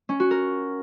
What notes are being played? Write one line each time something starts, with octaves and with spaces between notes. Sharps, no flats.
C#4
F#4
A#4